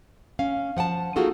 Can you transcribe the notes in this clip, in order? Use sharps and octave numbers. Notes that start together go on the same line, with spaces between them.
C#4 F5
F3 F#5 G5 A5
A#3 D#4 F4 F#4 G#4 A4